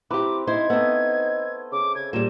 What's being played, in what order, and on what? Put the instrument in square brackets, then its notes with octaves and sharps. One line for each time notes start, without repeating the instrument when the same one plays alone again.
[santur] C4 B4 A#5 [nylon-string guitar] E4 G4 [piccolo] D6
[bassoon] D#4 [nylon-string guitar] E4 C5 [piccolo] G#6
[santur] A3 D#5 [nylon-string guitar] B3 C4
[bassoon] C#3 [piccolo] D6
[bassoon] C#3 [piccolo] G#6
[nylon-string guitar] A#2 G3 [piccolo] E7